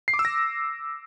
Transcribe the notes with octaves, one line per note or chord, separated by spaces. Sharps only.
C7
D6
E6
A#6